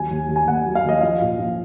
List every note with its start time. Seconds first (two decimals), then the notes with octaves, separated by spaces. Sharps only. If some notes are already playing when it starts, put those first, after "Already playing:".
Already playing: D#2 F#3 G#5
0.11 D#2
0.29 D#2
0.36 G#5
0.48 D#2 F#5
0.66 F#3
0.75 F5
0.84 D#2 D#5
1.01 F3 F5
1.22 A#2
1.40 F3